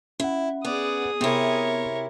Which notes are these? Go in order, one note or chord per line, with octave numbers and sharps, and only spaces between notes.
C#4 E4 F#5
B3 G#4 D5 D#6
C3 B3 E4 A#4 C#5